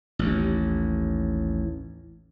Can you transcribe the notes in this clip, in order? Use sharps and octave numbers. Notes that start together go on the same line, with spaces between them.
A1 D#2